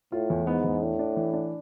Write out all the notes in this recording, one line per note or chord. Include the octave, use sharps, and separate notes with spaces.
A2 F4
E2
G#2 B3
E2
A2 D4
D4
E3
D4